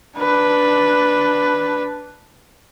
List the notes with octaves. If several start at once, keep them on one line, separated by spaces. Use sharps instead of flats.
D4 B4